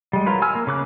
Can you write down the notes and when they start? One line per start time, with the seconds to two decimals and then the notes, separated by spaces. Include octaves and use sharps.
0.13 G3 G#3
0.26 F#3 F4 A#4 B4
0.42 G#5 E6 F6
0.55 A#3
0.67 C#3 D6 F#6